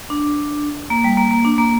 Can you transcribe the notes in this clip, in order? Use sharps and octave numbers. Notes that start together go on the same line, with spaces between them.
D4
A#3
G3
A#3
A#3
D4
A#3